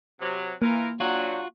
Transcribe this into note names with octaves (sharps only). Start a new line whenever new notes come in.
C3 F#3
E3 A#3 F4 A#4
F#3 D4 F4 F#4 G5